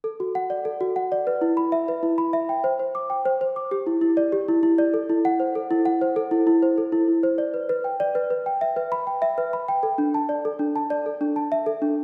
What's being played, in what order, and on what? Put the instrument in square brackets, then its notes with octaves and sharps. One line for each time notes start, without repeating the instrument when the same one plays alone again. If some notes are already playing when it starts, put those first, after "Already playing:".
[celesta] A4
F#4
F#5
D5
A4
F#4
F#5
D5
B4
E4
B5
E5
B4
E4
B5
E5
G5
C5
C5
D6
G5
C5
C5
D6
G4
E4
E4
D5
G4
E4
E4
D5
A4
E4
F#5
C5
A4
E4
F#5
C5
A4
E4
E4
C5
A4
E4
E4
C5
D5
B4
B4
G5
D5
B4
B4
G5
E5
B4
B5
G5
E5
B4
B5
G5
A4
D4
A5
D5
A4
D4
A5
D5
A4
D4
A5
E5
A4
D4